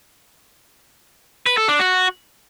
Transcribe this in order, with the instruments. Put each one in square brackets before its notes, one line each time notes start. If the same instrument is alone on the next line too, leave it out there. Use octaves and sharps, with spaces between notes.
[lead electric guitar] B4
A4
D4
F#4